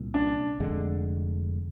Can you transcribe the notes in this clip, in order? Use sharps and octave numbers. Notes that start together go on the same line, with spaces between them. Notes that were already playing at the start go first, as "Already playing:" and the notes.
Already playing: C2 A#2
D4
F1 F2 D3 G#3